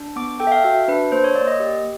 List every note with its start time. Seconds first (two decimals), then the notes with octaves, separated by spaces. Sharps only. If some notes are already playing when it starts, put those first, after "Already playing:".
Already playing: D4
0.16 B3 D6
0.40 A4 G5
0.47 E5
0.52 F5
0.64 F#4 E5
0.88 D4 B4
1.12 A#3 C5
1.24 C#5
1.35 A#3 D5
1.47 D#5
1.60 G4